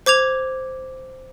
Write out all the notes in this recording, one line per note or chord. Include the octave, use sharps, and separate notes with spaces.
C5 D6 G#6 F7